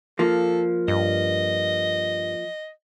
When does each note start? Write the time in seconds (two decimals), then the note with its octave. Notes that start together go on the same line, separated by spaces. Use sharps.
0.19 F3 A#3 A4
0.88 G2 D#5